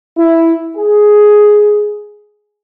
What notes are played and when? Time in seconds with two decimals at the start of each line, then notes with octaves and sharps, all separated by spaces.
0.17 E4
0.76 G#4